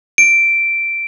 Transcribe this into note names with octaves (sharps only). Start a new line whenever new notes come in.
D7